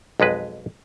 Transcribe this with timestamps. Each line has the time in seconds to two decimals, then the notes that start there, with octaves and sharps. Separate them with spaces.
0.20 B1 F2 G#3 B4